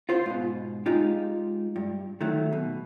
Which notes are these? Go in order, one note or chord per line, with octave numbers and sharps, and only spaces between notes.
F4 C5
G#2 B2
G#3 D#4 F4 G4
G2
D#3 F#3 A3
B2